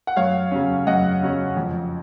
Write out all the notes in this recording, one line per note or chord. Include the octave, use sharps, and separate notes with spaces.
F#5
F#2 C#5 F5
C#3 F#3 C#4
F#2 D#5 F#5
C#3 F#3 C#4
F2